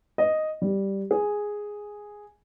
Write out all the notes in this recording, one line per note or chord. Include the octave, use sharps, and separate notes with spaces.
D#5
G3
G#4